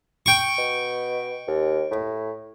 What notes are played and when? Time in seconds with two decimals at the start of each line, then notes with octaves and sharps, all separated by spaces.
0.26 G5 C#6
0.58 B2
1.48 D#2
1.91 A2